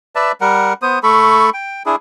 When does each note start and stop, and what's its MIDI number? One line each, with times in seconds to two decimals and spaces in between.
0.15 0.32 71
0.15 0.32 74
0.15 0.32 76
0.15 0.32 81
0.41 0.73 55
0.41 0.73 70
0.41 0.73 78
0.82 0.99 59
0.82 0.99 72
0.82 0.99 87
1.03 1.50 57
1.03 1.50 69
1.03 1.50 83
1.03 1.50 85
1.54 1.83 79
1.86 1.96 62
1.86 1.96 64
1.86 1.96 68